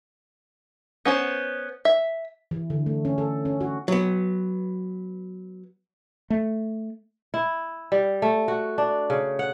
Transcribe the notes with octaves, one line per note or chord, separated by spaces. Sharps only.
B3 C#4 C5
E5
E3
D3
A3
C#4
A4
C#4
F#4
F#3 B3
A3
E4
G3
A3
F#4
D4
C#3
F#5